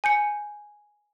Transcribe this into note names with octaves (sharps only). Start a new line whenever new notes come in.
G#5 G6 C#7